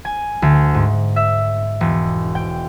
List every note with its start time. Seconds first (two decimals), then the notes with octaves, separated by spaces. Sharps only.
0.05 G#5
0.42 D2
0.74 G#2
1.16 E5
1.81 E1
2.35 G5